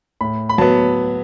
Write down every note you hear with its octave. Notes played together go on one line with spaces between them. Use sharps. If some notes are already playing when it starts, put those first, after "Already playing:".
A2 B5
B5
F#3 B3 A5